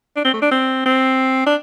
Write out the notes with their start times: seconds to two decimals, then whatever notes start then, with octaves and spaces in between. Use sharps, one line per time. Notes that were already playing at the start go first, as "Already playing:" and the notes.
0.16 D4
0.24 C4
0.33 A3
0.42 D4
0.51 C4
0.85 C4
1.46 D4